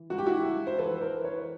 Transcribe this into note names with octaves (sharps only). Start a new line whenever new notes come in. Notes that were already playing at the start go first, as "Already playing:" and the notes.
Already playing: E3
C#2 F#4
G4
E4 F#4
C#2
C5
E3 A4 B4
A#4 C5
E3
B4 C#5